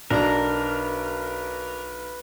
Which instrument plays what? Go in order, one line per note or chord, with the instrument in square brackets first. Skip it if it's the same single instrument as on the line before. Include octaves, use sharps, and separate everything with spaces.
[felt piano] B1 D5 [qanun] D4 A#5 [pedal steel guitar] A#4 [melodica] B4